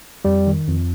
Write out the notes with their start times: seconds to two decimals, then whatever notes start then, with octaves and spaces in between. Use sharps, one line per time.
0.25 F2 G3
0.47 D#3
0.68 F2